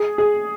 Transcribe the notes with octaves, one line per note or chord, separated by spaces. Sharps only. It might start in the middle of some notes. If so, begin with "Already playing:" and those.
Already playing: G#4
G#4